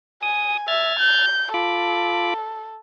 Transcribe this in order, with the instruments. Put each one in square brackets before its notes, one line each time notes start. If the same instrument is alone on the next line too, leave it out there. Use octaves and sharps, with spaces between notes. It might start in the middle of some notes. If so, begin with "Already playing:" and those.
[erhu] G#5 [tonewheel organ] D#6
[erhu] E5 [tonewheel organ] F6 G#6 A6
[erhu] G6
[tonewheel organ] F4 B5 D6 [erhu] A4